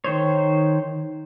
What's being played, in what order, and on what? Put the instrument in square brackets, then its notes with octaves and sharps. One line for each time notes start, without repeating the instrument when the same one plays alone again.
[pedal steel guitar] D#3 C5 C#5